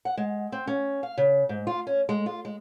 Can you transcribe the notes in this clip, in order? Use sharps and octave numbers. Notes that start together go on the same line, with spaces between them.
F#5
G#3
C4
C#4
F5
C#3
G#2
F4
C#4
G#3
F4
G#3